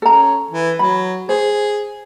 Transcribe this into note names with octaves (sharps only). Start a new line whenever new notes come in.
C#4 A4 A#5
E3
F#3 B5
G#4 C5